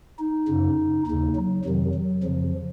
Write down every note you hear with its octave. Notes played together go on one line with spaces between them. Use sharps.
D#4
F#2 C#3
D#2 C#3 D#4
F#3
F2 C3 D#3 F#3
F#3
F2 C#3 F3